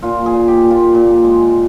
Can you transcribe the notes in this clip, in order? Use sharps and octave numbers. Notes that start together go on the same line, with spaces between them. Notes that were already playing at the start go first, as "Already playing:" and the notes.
A#2 F4
G#4
A#2
G4
A#2
F4
A#2
G#3